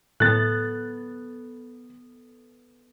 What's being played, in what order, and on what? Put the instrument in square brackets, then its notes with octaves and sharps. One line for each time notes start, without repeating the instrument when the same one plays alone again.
[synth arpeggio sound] A2 [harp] B3 A4 [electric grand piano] F#6 A6